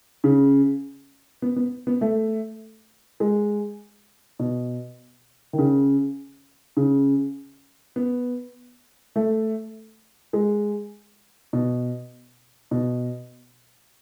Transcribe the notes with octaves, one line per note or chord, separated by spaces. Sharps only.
C#3
B3
B3
B3
A3
G#3
B2
D#3
C#3
C#3
B3
A3
G#3
B2
B2